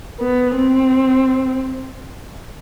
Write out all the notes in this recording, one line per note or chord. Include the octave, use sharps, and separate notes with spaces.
B3
C4